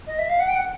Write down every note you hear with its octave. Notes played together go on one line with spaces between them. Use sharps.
D#5
E5
F5
F#5
G5
F#5